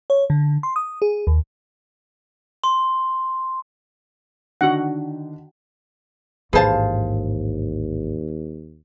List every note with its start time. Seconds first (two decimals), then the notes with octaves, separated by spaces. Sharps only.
0.10 C#5
0.30 D3
0.63 C6
0.76 D#6
1.02 G#4
1.27 D#2
2.64 C6
4.61 D3 D#3 D4 F#4 F#5
6.53 A1 D#2 G#2 G#4 B4 C5 F5 A5